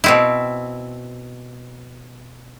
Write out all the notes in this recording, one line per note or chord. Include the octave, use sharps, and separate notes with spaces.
B2 C4 E4